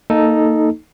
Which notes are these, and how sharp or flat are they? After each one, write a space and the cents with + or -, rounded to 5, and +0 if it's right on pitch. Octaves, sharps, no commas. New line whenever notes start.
A#3 -20 D#4 +0 A4 -5